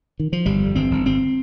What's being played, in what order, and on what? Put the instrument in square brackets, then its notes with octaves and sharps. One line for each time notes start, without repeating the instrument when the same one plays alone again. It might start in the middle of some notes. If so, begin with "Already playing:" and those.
[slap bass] D#3
F3
G1 G3
F2
G1 C4
G1
G1 C4